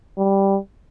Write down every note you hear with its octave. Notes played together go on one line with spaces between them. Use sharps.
G3